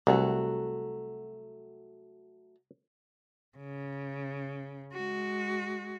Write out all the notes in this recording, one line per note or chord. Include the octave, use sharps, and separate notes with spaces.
C2 F#3 A3 F#4
C#3
G#3 F#4